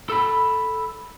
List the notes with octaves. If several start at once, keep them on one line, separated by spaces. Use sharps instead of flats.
A4 B5